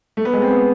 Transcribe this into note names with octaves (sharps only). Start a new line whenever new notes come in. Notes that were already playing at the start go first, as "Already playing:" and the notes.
A3
B3
G#3
C4
B3